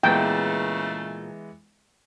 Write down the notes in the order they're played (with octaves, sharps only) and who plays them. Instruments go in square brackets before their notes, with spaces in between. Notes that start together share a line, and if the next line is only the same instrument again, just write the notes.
[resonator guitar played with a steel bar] A#2 [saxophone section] C#3 A3 [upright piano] E3 G#3 B3 [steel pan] G5